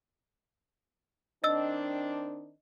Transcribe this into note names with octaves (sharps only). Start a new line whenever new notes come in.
D#3 C4 D4 D#5 E6 A6